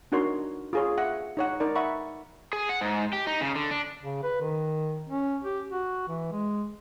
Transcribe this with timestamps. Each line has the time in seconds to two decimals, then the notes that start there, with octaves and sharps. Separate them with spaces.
0.12 D4 D#4 F#4 A#4 C#5 C6
0.73 F4 G#4 C#5
0.98 E5 F#5
1.37 D#4 C#5 F#5
1.60 D#4 A#4 D5
1.75 E5 F#5 B5 C#6
2.53 G#4
2.69 F#5
2.81 G#2
3.13 G4
3.27 D#4
3.41 C#3
3.55 D3
3.71 D4
4.03 C#3
4.23 B4
4.41 D#3
5.09 C#4
5.43 G4
5.70 F#4
6.08 E3
6.32 G#3